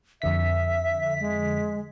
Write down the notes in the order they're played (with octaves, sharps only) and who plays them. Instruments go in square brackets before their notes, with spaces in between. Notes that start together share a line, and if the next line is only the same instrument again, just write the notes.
[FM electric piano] F2 D3 B6 [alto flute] E5
[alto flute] G#3